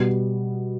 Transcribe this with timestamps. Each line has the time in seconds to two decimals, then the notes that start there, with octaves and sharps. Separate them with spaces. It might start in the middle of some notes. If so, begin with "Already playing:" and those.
Already playing: B2 G3 B3